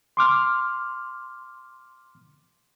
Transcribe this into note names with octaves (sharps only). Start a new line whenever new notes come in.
C6 D6 F6